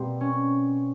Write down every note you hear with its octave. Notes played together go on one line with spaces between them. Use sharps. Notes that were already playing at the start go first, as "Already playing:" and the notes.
Already playing: B2 G3 A#3 C4
C#4